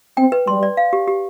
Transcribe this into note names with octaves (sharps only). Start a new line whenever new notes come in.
C4 G5
B4
G3 C6
D5
F5
G4
G4